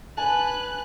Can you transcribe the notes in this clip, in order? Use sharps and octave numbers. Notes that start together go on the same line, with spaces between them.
B4 G#5 A5 F#6